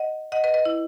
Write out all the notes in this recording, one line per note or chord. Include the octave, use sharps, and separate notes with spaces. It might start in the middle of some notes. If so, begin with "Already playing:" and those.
Already playing: D#5 F#5
D#5 F#5
B4 D#5
B4 D#5
E4